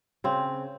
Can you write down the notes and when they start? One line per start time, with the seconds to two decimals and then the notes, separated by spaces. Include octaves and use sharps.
0.24 C#3 C4